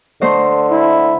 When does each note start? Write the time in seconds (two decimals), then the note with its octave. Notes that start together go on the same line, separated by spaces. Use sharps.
0.21 D3 A3 C5 D#5
0.71 E4